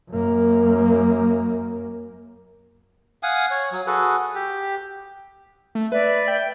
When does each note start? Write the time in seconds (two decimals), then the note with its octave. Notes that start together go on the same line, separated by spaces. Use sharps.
0.11 F#2 A#3
3.23 F5 F#5 G#5 D#6
3.51 C#5
3.72 F#3
3.87 F#4 G#4 A4 B4
4.35 G4
5.75 A3
5.92 B4 D5 E5
6.28 G5